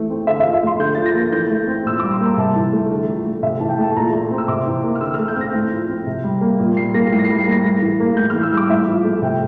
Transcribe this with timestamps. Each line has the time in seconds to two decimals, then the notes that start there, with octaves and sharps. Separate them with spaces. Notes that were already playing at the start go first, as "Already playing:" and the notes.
Already playing: E3 A3
0.10 C4
0.27 D3 E5
0.35 F5
0.40 E5
0.45 F3
0.53 E5
0.63 A3 C6
0.79 D3 G6
0.95 F3 A6
1.06 A#6
1.15 A#3
1.32 E3 G6
1.50 A3
1.68 C4
1.85 A#2 E6
2.00 G3 D6
2.12 C6
2.21 A#3 A#5
2.37 C3 A5
2.56 E3
2.73 A3
2.90 D3
3.09 F3
3.26 A3
3.43 C3 E5
3.60 E3 A5
3.69 G5
3.78 A3 A5
3.91 A5
3.96 A#2 A#5
4.13 A3
4.31 C4
4.38 E6
4.48 C3 D6
4.66 E3
4.83 A#3
4.95 F6
5.01 D3 E6
5.14 A3 F6
5.28 G6
5.36 C4 A#6
5.54 A2
5.72 F3
5.89 C4
6.07 C3
6.24 G3
6.41 A#3
6.59 A#2
6.77 G3 C7
6.94 A#3 A#6
7.12 A2 C7
7.19 A#6
7.25 G3 C7
7.39 C7
7.47 A#3 A#6
7.64 A2 A#6
7.82 E3
8.00 A#3
8.17 A2 G6
8.30 E3 F6
8.43 E6
8.52 G3
8.57 D6
8.70 A2 E5
8.88 F3
9.05 A3
9.22 C3 G5